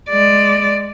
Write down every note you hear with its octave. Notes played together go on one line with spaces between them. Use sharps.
G#3 D5